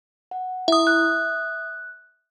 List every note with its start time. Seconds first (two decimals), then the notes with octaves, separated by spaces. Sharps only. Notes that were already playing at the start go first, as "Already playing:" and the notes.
0.31 F#5
0.68 E4 E5 D#6
0.87 F#6